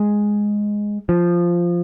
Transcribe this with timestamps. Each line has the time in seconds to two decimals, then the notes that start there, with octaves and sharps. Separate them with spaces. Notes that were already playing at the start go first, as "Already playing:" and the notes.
Already playing: G#3
1.09 F3